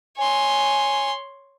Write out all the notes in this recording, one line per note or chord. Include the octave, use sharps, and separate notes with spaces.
C#5 G#5 C6